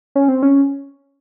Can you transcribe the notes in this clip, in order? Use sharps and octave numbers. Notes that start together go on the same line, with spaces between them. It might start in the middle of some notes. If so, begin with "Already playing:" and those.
C#4
C4
C#4